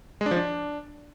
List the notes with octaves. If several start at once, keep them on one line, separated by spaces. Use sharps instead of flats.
G#3
D4
F3
D4